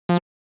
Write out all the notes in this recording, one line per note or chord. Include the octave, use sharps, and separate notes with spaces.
F3